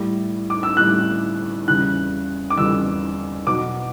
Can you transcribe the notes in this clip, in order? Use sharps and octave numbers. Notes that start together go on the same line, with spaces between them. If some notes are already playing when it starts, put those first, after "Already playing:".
Already playing: A2 G3
D6
E6
A2 G3 F#6
E2 C#3 G3 F#6
D6
E2 C#3 G3 E6
B2 F#3 D6